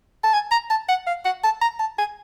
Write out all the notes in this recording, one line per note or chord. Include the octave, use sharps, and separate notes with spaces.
A5
G#5
A#5
A5
F#5
F5
F#5
A5
A#5
A5
G#5